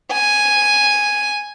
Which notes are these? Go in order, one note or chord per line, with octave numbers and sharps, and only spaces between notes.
G#5